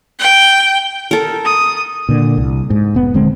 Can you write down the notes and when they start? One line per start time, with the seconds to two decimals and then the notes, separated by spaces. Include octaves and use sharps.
0.19 G5
1.11 A4 A#4
1.46 D#6
2.09 A#2 D3
2.37 C2
2.70 G#2
2.94 F1 B3
3.14 D#1 D3 G#3 C4